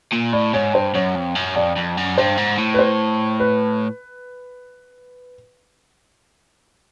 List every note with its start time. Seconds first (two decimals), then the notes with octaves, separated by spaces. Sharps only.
0.13 A#2
0.33 A2 D5
0.54 G#2 C#5
0.74 G2 C5
0.95 F#2 C#5
1.16 F2
1.35 F#2
1.56 F2 D5
1.77 F2
1.97 F#2
2.18 G2 C5
2.38 G#2
2.58 A2
2.74 B4
2.79 C5
3.40 B4